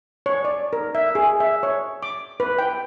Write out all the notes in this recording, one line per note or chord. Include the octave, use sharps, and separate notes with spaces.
C#5
D5
A#4
E5
G#4
E5
C#5
D6
B4
G5